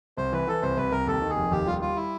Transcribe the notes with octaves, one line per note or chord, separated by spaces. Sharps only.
C2 C5
E3 B4
E3 A4
C2 C5
C2 B4
C2 A#4
D#2 A4
D#3
G#4
F1
D#2 G4
G3 F4
G3 F4
E4